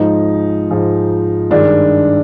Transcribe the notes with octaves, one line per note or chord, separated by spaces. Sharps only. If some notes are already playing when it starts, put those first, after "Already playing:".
Already playing: G#2 F3 G#3 D#4
G#2 F3 G#3
G2 D#3 G#3 D4